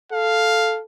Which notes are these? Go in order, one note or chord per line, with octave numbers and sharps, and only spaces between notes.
A4 F5